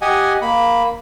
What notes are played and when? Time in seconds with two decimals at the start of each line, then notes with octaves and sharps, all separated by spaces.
0.02 G4 D#5 F#5 G#5
0.42 A#3 B5